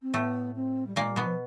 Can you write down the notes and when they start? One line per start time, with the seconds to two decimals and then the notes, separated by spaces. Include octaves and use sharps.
0.02 C4
0.13 A2 A3 B3
0.55 C4
0.86 G3
0.96 A#2 G#3 A#3
1.10 G3
1.16 B2 B3
1.24 F3